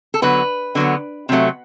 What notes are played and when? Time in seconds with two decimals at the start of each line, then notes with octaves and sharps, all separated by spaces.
0.14 A4
0.22 D3 F#3 B3 B4
0.75 D3 F#3 B3
1.29 C3 F#3 A3